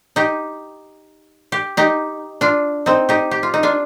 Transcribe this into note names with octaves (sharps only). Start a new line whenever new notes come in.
D#4 G4
G4
D#4 G4
D4 F4
C4 D#4
D#4 G4
G4
F4
D#4
D4 F4